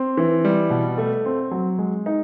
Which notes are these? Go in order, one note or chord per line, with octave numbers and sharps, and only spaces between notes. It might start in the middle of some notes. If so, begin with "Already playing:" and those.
Already playing: C4
E3
G3
B2
A3
C4
F#3
G#3
D#4